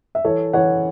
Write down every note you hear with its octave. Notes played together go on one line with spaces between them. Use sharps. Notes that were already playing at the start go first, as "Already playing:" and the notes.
E5
E3 A4 C#5
E3 C#5 F#5